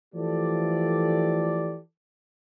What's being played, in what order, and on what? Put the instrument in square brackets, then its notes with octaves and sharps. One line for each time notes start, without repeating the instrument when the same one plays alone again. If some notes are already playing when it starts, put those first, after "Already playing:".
[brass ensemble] E3 F3 A3 G4 A4 D5